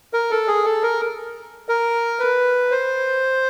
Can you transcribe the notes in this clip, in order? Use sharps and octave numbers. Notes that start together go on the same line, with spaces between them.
A#4
A4
G#4
A4
A#4
A#4
B4
C5